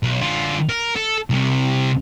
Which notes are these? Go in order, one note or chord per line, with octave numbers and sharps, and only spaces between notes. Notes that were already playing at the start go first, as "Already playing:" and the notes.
B1
D3 F4
A#4
A4
C2 C3